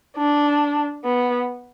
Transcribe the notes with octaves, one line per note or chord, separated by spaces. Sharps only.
D4
B3